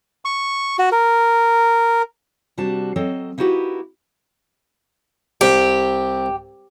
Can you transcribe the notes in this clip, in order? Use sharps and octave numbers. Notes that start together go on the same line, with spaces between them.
C#6
F#4
A#4
C3 G3 D4 F#4 A5
F#3 C4 A4 D#5
A#3 D#4 E4 F#4 G4 B4
C2 C4 G4